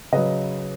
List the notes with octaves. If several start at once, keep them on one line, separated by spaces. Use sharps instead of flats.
C#3 F#3 B4 D#5